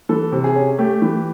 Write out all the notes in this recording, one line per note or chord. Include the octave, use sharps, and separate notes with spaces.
E3 A4
C3
G#4
C#4
A3 G4
E3